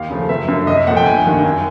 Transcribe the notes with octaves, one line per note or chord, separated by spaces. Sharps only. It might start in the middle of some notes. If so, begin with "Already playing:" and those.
Already playing: D#2 F5
C#3 F3 A3
F#1 E5
F#2 D3
C2 D#5
E5
A#2 F3 A3 F#5
G5
G1 G#5
G2 D#3
F#2 G#5